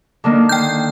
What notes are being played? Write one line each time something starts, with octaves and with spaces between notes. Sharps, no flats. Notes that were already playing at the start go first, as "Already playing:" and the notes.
D3 D#3 A#3
G5 G6